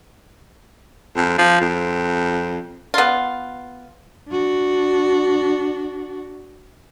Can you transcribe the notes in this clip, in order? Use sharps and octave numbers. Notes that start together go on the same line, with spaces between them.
F2
F3
F2
B3 F4
D4 F#4